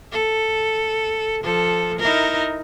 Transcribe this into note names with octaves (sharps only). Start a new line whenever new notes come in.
A4
F3 A4
D#4 E4 A#4